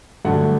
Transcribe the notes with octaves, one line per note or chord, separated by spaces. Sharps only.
G2 D3 F#3 A3 F#5